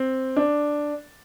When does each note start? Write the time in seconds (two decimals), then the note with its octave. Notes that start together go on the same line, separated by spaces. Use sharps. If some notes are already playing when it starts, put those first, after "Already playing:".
Already playing: C4
0.37 D4